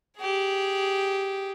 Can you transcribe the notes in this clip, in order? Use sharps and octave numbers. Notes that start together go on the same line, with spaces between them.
G4 G#4